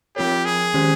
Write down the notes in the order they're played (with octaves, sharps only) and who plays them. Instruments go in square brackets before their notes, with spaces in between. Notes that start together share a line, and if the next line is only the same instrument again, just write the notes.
[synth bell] F3 C4 F4 A#4 C#5 [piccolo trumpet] G4
[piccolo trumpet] G#4
[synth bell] D#3 G#3 C#4 G4 C5